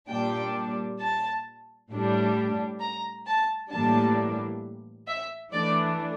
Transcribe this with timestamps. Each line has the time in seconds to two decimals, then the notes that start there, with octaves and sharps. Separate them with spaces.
0.10 A#2 G3 D4 G5
1.00 A5
1.91 A2 G3 D4
2.80 A#5
3.27 A5
3.71 A2 E3 G3 A#3 D4 A5
5.08 E5
5.52 E3 A3 D4 D5